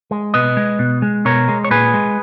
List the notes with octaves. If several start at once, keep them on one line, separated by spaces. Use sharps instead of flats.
G#3
B2 B4 D#5
G#3
B2
G#3
B2 A#4 C#5
G#3
C#5
A#2 G#4 B4
G#3